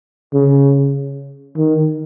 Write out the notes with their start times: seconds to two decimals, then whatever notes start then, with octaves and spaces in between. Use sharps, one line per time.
0.34 C#3
1.57 D#3